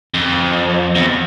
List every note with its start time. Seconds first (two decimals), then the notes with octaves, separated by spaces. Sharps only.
0.14 F2
0.95 E2